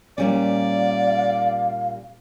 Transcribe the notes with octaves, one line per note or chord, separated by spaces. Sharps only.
A#2 G3 C#4 D5 F5